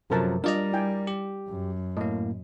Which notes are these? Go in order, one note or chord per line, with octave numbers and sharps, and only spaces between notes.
F#2 C3 F3 F#3 A4 A#4 A5
G3 D4 F4 A#4 D5 D#5 A#5
E4 G5 G#5
G4
F#2
A2 A#3 D#5